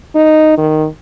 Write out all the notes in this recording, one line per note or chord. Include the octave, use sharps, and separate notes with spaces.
D#4
D#3